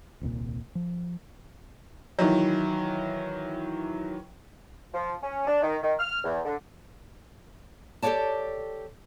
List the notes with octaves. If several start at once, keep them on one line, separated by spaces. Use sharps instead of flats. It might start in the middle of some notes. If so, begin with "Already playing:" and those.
D#1 C2 A#2
F3
D#3 E3 F#3
F3
C#4
D4
D#3
D#3
F6
E2
D3
G4 A4 B4 C#5 D5 A5